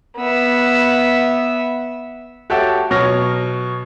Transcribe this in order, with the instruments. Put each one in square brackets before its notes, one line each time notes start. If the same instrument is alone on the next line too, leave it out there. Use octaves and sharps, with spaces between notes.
[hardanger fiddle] B3 E5
[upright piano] F#4 G4 A4 C#5 E5 G5
B2 F#3 C#5 F6 A#6